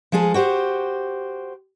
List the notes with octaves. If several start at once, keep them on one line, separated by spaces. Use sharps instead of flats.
F3 G#3 G#4 A4
F#4 G4 C5